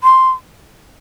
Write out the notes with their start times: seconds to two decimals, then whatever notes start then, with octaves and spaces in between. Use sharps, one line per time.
0.03 C6